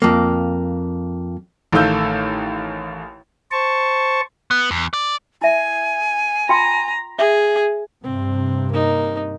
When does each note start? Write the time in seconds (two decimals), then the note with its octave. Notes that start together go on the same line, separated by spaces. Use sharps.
0.02 F2 A#3
1.72 A1 D#3 A3 F5 E6 G6
3.52 C5 A5 C#6
4.51 B3
4.71 E2
4.94 D5
5.42 E4 E5 G#5
6.49 F4 G5 A#5 C6
7.19 G#4 E5
8.04 G2 C3 C4
8.72 A#3 D#4